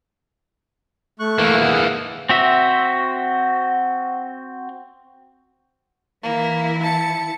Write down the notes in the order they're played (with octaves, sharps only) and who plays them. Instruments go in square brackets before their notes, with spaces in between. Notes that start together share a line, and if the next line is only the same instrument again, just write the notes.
[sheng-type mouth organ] A3 C#6 F#6
[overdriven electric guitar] E3 A#3
[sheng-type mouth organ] G#4 F#5
[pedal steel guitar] C4 F#4 E5
[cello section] E3 E4 [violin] A#3
[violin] A5 C#7